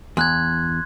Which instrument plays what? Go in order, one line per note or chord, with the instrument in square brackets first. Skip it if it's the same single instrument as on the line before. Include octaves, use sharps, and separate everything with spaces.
[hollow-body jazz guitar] E2 [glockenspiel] C6 F#6 G#6